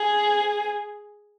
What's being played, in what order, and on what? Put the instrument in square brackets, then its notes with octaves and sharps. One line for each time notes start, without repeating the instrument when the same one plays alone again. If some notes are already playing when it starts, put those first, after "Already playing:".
Already playing: [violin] G#4